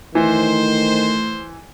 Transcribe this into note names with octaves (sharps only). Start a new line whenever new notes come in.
D#3 E3 A3 C5